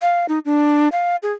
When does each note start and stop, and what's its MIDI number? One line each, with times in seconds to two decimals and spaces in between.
0.02 0.26 77
0.29 0.39 63
0.45 0.88 62
0.92 1.16 77
1.23 1.33 68